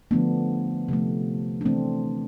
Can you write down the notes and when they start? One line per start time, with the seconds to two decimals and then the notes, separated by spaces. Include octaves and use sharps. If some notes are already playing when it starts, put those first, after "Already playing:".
0.11 D3 F3 A3 B3 D4
0.88 C3 F3 A3
1.61 D4
1.65 C3 E3 A3 C4